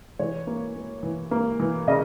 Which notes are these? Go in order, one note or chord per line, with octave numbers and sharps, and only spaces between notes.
E3 C#5
A#3
A#3
E3
A#3
E3
C#3 D#5